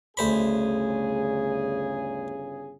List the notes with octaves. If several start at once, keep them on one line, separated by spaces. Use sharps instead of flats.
G1 D2 C#3 G#4 C5 B5